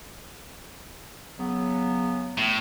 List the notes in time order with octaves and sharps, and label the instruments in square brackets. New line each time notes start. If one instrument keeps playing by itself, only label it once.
[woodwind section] C#3 F#3 B3
[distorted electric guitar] A2